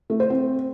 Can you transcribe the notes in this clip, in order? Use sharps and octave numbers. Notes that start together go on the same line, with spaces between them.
A3
C5
C4